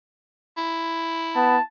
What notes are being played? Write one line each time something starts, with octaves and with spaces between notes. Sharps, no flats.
E4
B3 A5